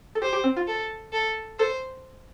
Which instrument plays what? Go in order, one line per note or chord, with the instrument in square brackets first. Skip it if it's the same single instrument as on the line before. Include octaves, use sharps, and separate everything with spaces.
[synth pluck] A4
[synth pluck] G4 [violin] C5
[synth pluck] G4
C4
F4
[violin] A4
A4
[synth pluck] A4 [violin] C5